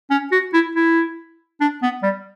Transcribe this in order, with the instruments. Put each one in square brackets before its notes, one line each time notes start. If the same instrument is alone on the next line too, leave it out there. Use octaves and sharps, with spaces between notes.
[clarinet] C#4
F#4
E4
E4
D4
B3
G3